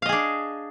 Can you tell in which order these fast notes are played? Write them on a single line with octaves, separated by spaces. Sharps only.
F5 D#5 G#4 D4